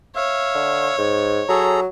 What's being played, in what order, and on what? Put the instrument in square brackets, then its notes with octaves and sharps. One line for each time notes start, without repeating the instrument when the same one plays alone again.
[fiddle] C#5 [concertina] E5 F5
[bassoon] D3
G#2
[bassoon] F#3 [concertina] G#4 A4 A#5